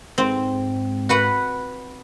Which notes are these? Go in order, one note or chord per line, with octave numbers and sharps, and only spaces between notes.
G#2 C4
F#4 B4 F#5